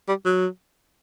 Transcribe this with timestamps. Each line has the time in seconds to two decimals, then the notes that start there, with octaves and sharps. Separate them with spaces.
0.08 G3
0.25 F#3